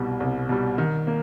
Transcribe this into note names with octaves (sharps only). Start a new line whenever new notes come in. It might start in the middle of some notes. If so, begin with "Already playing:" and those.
Already playing: C2 B2 G3
C2
B2 G3
D#3
A#3